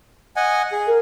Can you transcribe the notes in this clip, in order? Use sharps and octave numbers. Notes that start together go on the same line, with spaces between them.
D#5 F#5 G#5
G#4
A#4